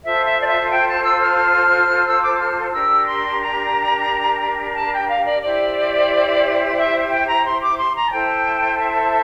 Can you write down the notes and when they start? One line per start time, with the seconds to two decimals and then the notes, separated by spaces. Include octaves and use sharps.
0.04 F4 A4 C5 E5
0.26 E5
0.41 D5
0.48 E5
0.72 G5
0.88 A5
1.04 E6
1.22 F6
2.06 E6
2.22 D6
2.39 F6
2.73 D4 G4 A#4 E6
3.07 C6
3.41 A#5
4.75 A5
4.93 G5
5.09 F5
5.26 D5
5.43 E4 G4 C5 D5
6.78 E5
7.10 G5
7.28 A#5
7.44 C6
7.62 D6
7.78 C6
7.95 A#5
8.06 A5
8.12 E4 A4 C5 G5
8.79 E5